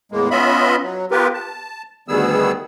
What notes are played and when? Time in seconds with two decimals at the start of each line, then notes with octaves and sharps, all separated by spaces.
0.12 E2 A2 G#3 A#3
0.31 B3 C#4 F4 D#5 E5 B5
0.83 F#3
1.11 B3 F4 G4 A#4 B4
1.34 A5
2.08 D2 D#3 G3 B3 G#4 E6